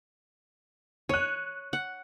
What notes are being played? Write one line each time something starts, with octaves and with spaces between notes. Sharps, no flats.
C#5 F#6 D#7
F#5